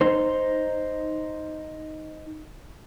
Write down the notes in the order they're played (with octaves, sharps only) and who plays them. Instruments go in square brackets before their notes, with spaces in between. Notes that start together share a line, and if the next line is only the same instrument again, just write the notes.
[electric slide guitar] D#4 C5